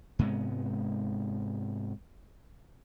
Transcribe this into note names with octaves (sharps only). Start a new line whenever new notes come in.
G#2 C3 G#3 B3